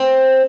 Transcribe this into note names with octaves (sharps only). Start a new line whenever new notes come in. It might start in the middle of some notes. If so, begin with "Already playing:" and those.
Already playing: C4